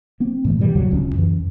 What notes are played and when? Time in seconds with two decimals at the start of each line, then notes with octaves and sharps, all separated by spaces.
0.20 A#3 C4
0.45 A2 E3 A3
0.58 G#2 B2 E3 G3
0.75 D#2 C3 D#3 F#3
0.90 D1 C#2 C4 C#4
1.15 F#2 E3